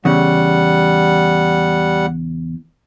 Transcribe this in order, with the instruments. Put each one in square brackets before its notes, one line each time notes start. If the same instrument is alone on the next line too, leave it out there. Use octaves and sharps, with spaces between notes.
[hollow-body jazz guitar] E2 C#3 [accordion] G3 F#5